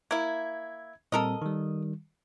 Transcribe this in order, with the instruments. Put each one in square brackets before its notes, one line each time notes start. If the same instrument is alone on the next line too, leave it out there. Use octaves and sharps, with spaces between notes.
[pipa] A#3 E4 [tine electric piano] G#6
[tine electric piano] A#2 G3 C4 [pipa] A4 A#4 D#5
[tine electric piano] D#3 G3